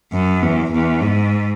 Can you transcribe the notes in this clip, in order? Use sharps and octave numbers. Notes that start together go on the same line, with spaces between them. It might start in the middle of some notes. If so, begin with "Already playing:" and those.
F#2
E2
E2
G#2